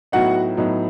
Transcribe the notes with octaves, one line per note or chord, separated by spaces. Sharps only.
A2 F#3 B3 D#4 F#4 F#5
A2 F#3 B3 D#4